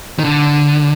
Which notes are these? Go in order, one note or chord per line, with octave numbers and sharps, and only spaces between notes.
D#3
D3